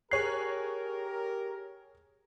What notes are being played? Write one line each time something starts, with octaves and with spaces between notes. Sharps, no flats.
G4 G#4 A#4 C#5 F#6 C7